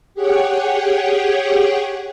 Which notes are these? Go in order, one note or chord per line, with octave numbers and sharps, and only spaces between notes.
G4 G#4 C#5 F#5 G5